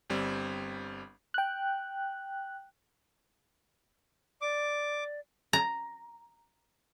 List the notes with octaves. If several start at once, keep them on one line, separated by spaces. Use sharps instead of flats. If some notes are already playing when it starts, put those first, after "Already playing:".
G1 G3 C4
G5 F#6
D5 D6
A#5